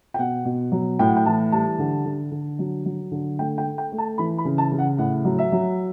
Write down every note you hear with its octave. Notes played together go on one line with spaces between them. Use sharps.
G5
B2 F#5
B2
F#3
A2 G5
F#5
G5
E3 A5
G3 A5
D3
D3
D3
F#3
F#3
D3
A3 G5
G5
A3
G5
A3
A5
E3 B5
B5
C#3
A5
C#3
F#5
A2 F#5
F#3
E5
F#3